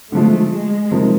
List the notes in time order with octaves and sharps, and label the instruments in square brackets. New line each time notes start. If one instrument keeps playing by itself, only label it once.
[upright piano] D3 F3 G#3 [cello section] A3
[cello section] G#3
[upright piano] C3 F3 A#3 D#4